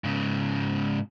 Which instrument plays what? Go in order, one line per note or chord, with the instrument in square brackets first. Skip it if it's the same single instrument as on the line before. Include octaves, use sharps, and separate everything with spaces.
[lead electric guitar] G#2 C#3